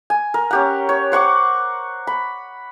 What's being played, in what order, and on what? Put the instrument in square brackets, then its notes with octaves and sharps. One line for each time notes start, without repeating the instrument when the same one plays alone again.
[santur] G#5
A#4
C#4 G4 F#5
C#5
C5 F#5 C#6 D6
B5